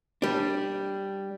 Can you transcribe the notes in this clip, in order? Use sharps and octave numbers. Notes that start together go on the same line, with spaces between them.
G3 D4